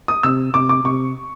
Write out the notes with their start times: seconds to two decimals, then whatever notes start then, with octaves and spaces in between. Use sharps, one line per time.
0.08 D#6
0.23 C3 E6
0.54 C3 D6
0.69 D6
0.84 C3 C#6